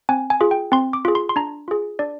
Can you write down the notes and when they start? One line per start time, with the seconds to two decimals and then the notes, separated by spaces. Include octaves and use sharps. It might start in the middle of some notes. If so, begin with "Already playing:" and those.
0.09 C4 G#5
0.30 G#5
0.41 F4 G#4
0.51 G5
0.72 C4 C6
0.93 D6
1.05 F4 G#4
1.15 C6
1.29 C6
1.36 D4 A#5
1.68 F4 G#4
1.99 D4 D5